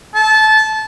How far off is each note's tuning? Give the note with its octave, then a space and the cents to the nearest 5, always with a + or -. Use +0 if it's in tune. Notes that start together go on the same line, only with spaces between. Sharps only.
A5 -20